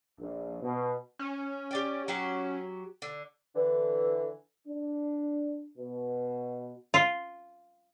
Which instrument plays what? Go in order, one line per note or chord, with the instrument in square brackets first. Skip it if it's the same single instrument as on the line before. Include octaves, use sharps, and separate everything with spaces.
[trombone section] A#1
B2
[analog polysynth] C#4
[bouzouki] G4 D5 G5
F#3 F#4 G4
D3
[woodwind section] D3 E3
[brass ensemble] D4
B2
[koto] F4